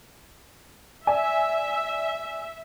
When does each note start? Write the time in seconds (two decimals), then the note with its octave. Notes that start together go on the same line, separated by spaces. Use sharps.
1.07 D5 E5 G#5